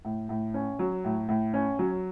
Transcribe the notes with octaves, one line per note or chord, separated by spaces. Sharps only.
A2
A2
C#4
F#3
A2
A2
C#4
F#3